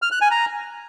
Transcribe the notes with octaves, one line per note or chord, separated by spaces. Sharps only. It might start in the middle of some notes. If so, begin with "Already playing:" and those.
F6
F#6
G#5
A#5